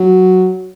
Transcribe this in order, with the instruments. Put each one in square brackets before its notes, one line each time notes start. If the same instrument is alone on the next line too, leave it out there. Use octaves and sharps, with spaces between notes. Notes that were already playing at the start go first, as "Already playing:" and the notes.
Already playing: [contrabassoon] F#3